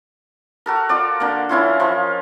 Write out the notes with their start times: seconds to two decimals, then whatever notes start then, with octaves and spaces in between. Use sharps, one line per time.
0.66 F#4 A4 A#4
0.89 F4 F#4 D5
1.20 D3 A#3
1.49 E3 C#4 E4 F4
1.80 F3 F4 D#5